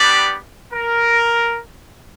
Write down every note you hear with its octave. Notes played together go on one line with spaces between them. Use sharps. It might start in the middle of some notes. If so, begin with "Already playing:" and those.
Already playing: G3 B3 D4 G4 D5
A#4